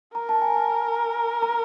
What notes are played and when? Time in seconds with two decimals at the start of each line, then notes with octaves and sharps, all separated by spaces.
0.15 A#4 A#5
0.29 A5
0.42 G#5
0.56 A5
1.42 A#5